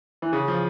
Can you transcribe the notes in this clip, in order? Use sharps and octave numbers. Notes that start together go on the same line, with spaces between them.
E3
C#3
F3